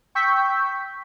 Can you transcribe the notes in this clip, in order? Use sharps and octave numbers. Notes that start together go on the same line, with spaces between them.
G5 C#6 E6 G6 B6